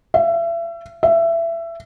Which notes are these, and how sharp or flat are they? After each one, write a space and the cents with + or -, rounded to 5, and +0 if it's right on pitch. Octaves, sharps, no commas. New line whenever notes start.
E5 +35
E5 +20